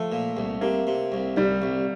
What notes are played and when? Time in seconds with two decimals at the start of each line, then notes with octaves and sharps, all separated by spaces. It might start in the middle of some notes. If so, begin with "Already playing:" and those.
Already playing: F3 A3
0.12 A#2
0.37 C2
0.61 C3 A#3
0.87 C3
1.12 C2
1.37 C2 G3
1.62 C2